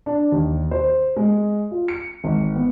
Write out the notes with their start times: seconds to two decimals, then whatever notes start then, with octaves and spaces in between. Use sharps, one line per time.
0.06 D4
0.32 D#2
0.71 C5
1.16 G#3
1.71 F4
1.88 C#7
2.24 G#1
2.56 B3